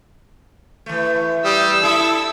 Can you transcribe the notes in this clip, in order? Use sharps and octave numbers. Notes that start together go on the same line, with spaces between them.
E3 A3
G3 D#6 E6
E4 A4